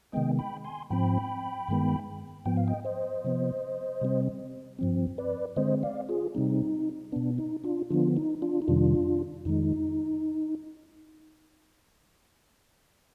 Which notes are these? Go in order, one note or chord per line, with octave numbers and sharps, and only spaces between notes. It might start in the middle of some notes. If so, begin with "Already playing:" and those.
C3 D#3 G#3 B3 D#5 G5
G5 B5
G#5 C6
G#2 F3 C4 G5 B5
G2 D#3 G#3 B3
G#2 F3 B3 G5
F5
D#5 G5
C5 D#5
C3 F3 B3
C3 G3 C4
G2 F3 C4
B4 D5
D3 G#3 C4 C5 D#5
D5 F5
F4 G#4
C3 G3 C4 D#4
B2 B3 D4
D#4
D4 F4
D3 F3 B3 D4 F4
D#4
D4 F4
D#4
F2 C3 D#3 G3 D4 F4
F2 D#3 G#3 D#4